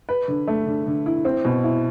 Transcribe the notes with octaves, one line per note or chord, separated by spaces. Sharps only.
B4
D3
A3
D3
D3
E4
C4
B2
E4